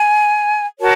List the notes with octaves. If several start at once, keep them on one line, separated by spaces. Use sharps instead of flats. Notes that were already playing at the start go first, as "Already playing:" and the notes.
Already playing: G#5
F#4 A#4 C#5 A5